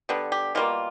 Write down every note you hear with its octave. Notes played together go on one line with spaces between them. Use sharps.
D3 G3 B3
G4
B2 G3 A#3 F4